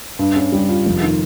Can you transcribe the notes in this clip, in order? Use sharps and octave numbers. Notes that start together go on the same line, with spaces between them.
G2
C#4
G3
F4
F1
D#3